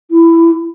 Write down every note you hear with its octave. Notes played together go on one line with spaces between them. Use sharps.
E4